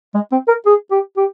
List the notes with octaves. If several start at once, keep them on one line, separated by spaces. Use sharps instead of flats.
G#3
C4
A#4
G#4
G4
G4